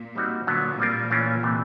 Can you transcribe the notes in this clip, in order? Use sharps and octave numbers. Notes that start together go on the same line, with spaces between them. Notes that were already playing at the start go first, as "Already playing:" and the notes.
Already playing: A#2
G3 C4 D#4 F#4
A#2 D3 F#3 B3
G3 C4 F4 A#4
E3 A3 C#4 F4 A#4
C3 E3 A3